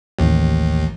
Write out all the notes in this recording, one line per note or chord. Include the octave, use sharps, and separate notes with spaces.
A1 D#2